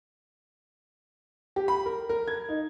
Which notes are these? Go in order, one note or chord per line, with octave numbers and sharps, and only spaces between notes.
G4
B5
A#4
A#4
G#6
D#4